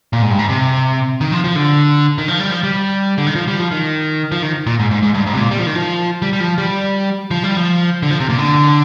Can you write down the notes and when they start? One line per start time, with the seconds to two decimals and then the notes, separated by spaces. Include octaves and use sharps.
0.13 A#2
0.22 G#2
0.31 G2
0.39 G#2
0.49 C3
1.21 D#3
1.32 F3
1.44 F3
1.56 D3
2.18 D#3
2.28 F3
2.40 G3
2.51 F3
2.63 G3
3.18 D3
3.27 D#3
3.35 F3
3.48 G3
3.59 F3
3.72 D#3
4.32 F3
4.43 D#3
4.67 A#2
4.80 G#2
4.91 G#2
5.02 G#2
5.14 G2
5.27 G#2
5.34 C3
5.39 A#2
5.51 G3
5.59 F3
5.67 D#3
5.75 F3
6.22 G3
6.33 G3
6.40 F3
6.58 G3
7.31 F3
7.44 G3
7.57 F3
8.03 D3
8.11 F3
8.20 C3
8.30 A#2
8.38 D3